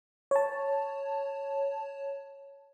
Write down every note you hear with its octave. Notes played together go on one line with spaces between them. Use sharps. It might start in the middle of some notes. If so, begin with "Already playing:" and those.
C#5 A5